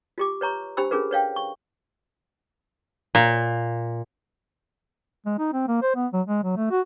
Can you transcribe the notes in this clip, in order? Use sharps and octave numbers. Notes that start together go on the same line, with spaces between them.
F4 G4 D6
B4 C#5 A#5 C#6
D4 G4 C5 B5 E6
C#4 D4 F4 G#4 A#4 B4
B4 C#5 F5 G5
C#6
A#2
G#3
D#4
C4
A#3
C5
B3
F#3
G#3
F#3
A3
F#4